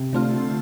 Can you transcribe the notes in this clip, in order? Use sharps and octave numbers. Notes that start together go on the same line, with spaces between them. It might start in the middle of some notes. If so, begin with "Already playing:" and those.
Already playing: C3
D3 A3 C4 F4